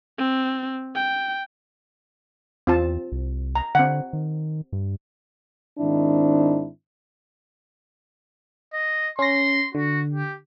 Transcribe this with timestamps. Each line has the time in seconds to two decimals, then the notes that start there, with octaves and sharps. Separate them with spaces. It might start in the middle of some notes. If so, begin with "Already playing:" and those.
0.18 C4
0.96 G5
2.67 E2 C4 F4 A5
3.12 C2
3.55 A#5
3.75 D3 C4 F#5
4.13 D#3
4.73 G2
5.79 G#2 D#3 C4 D4 E4
8.73 D#5
9.19 C#4 C6 A#6
9.75 D3 F#4
10.14 G4